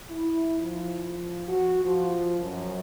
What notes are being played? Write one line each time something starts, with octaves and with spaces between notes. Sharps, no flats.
E4
F3
F#4
F3
F#2